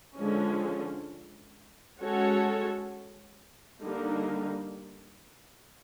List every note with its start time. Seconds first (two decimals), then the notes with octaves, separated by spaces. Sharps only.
0.16 D3 F3 G#3 C#4
1.99 G#3 C#4 F#4 A4 C#5
3.82 D3 G3 A#3 D#4